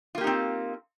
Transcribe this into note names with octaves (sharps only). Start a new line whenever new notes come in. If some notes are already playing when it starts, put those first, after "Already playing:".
A#3 C4 D#4 F4 G4